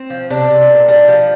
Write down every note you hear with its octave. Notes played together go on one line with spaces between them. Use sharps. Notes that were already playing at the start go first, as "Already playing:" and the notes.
Already playing: C4
F3
C3 D4
C3
A#2
G3
F3